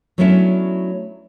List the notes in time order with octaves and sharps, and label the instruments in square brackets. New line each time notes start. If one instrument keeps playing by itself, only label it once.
[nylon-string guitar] F#3 A3 B3 C#4 D4 E4